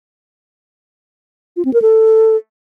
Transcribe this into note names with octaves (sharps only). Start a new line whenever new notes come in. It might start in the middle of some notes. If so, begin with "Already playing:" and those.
F4
C4
A#4
A4